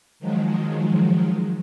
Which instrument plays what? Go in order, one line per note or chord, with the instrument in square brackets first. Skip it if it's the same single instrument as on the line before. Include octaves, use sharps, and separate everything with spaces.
[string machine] D#3 F3 F#3 G#3